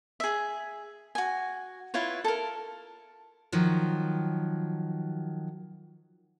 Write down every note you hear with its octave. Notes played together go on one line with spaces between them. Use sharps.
G#4 E5
F#4 G#5
E4 F4 B4 C#5
A4 A#4
D#3 F3 F#3